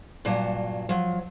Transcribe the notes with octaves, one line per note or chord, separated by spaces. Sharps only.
G2 A#2 F#3 A5
F3 F#3